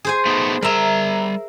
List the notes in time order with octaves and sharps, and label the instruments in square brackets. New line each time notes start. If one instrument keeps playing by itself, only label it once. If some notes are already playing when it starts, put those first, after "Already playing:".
[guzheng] G#4 C5 G#5
[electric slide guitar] A3 B3 D#4
[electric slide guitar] G3 A#5 [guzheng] A#4 E5